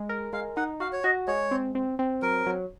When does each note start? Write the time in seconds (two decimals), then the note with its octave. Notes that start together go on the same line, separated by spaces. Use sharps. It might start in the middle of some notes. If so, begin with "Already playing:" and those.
Already playing: G#3
0.09 A#4
0.33 G#3 F5
0.57 D#4 F#5
0.80 F#4 F5
0.93 C#5
1.04 F#4 D#5
1.28 G#3 C#5
1.51 C4
1.75 C4
1.99 C4
2.22 F#3 A#4
2.46 F#3